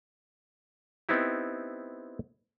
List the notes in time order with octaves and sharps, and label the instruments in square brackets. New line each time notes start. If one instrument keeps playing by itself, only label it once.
[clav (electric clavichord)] B3 C4 D#4 E4 G4